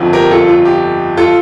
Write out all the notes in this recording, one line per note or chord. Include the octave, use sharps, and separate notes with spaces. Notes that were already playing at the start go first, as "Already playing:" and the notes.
Already playing: G1 F2 D3 F3
G4 A#4
F4 A4
F4
G4
F4 A4